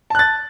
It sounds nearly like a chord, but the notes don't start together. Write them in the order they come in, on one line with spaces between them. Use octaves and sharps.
A5 F#6 A6